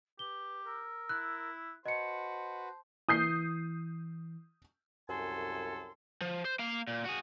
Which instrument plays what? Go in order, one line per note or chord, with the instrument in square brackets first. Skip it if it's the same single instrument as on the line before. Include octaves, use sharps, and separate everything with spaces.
[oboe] G4 [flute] B4 [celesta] G7
[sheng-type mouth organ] A#4 [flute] E6
[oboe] E4 [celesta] F#6
[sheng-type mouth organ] F#4 B4 [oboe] C5 [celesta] D#5 C#7 [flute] A5
[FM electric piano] E3 [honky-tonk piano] D#6 G6 C7
[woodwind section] C2 F#2 A4 G#5 C6
[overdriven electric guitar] F3
C5
A#3 F5
A#2
F#4 G#4